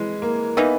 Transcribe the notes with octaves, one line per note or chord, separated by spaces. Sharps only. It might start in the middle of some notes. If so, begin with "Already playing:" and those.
Already playing: E3 G#3
A#3
E3 A#3 B3 D#4